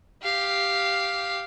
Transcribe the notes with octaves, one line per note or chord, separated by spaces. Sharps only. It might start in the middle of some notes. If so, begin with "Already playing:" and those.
G4 F5